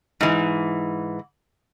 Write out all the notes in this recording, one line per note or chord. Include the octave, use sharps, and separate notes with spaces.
G#2 E3